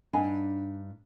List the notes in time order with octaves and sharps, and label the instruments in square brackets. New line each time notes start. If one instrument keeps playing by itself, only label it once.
[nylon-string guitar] G2 D4 D#4 [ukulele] F#5 G#5 B5